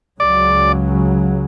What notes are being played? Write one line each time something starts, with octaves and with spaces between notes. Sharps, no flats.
C#2 C#3 F#3 D5